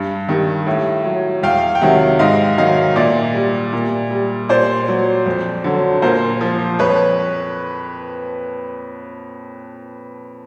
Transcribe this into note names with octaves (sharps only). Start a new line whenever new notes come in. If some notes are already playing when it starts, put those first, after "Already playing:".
Already playing: G2
D#3 G3
A2
F#3
E2 F5 G5
G5
C3 D#3 F#3 E5 F#5
G#2 D#5 F5
D#3 F#3 D#5 F5
A#2 D5 E5
G3
A#2
G3
A#2 C5 D5
F#3
F2
D3 F#3
A#2 A#4 C5
F3
F2 B4 C#5